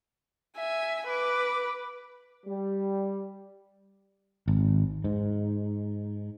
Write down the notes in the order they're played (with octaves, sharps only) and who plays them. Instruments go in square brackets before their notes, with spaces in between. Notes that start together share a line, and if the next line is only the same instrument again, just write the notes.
[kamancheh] E5 G#5
B4 D6
[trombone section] G3
[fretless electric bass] G#1
G#2